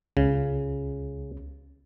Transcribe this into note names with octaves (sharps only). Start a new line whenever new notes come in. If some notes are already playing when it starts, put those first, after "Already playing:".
C#2 C#3